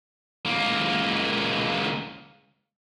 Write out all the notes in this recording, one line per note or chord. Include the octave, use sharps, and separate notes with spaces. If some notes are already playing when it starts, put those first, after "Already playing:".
C#2 A#3